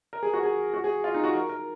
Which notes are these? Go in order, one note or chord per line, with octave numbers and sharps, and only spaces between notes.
A#4
G#4
F#4
G#4
F#4
G#4
F4
D#4
F#4
A#4
A#4